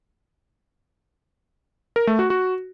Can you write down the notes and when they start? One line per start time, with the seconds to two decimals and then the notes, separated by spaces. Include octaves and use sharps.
1.96 A#4
2.07 A3
2.19 F#4
2.30 F#4